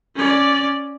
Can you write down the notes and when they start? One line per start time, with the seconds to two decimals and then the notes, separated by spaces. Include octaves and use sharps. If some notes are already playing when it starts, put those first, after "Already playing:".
0.15 C#4 D5